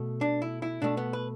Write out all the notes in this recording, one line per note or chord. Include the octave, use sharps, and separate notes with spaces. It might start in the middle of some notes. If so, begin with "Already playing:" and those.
Already playing: B2 A3
D4
E4
E4
B2 A3 D4
B3
B4